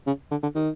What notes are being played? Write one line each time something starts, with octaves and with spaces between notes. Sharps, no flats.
C#3
D3
D3
D#3